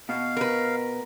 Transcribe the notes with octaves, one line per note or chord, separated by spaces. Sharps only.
B2 F5
A#4 B4